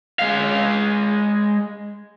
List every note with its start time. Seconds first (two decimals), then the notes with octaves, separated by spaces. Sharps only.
0.19 G#3 F5